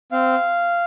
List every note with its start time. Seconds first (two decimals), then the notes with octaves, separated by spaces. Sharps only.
0.12 C4 F5